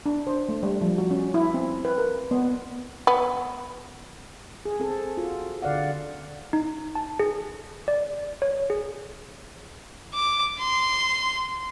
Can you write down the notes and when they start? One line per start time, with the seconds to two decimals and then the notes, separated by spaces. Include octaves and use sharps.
0.06 D4
0.27 C5
0.49 A3
0.63 G3
0.81 F3
0.98 F#4
1.11 C#4
1.34 E4
1.54 C4
1.85 B4
1.98 A#4
2.31 B3
3.07 B3
4.65 G#4
4.80 C4 A4
5.17 F4 F#4
5.62 D3 D5 F5 F#5
6.53 D#4
6.95 A5
7.20 G#4
7.88 D5
8.42 C#5
8.70 G#4
10.14 D6
10.59 C6